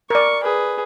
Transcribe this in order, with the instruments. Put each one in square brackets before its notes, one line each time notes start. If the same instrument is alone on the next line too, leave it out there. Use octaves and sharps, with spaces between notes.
[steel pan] A#4 D5 [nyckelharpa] C#6
[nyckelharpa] G#4 B4